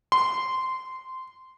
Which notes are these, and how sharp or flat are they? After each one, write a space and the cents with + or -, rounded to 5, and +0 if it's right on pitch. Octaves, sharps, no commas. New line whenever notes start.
C6 -15